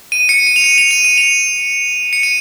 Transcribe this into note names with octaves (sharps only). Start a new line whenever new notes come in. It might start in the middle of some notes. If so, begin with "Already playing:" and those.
D#7
C#7
D#7
F7
D#7
F7
D#7
D#7
F7
C#7
D#7